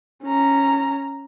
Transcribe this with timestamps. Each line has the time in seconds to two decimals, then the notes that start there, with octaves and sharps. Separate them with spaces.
0.24 C#4 A#5